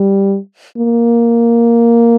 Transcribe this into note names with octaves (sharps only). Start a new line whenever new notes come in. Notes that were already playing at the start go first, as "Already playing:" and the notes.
Already playing: G3
A#3